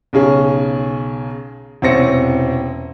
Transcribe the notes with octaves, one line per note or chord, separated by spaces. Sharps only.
B1 C#3 C#4 G#4
E1 C3 C4 C#4 A#6 C#7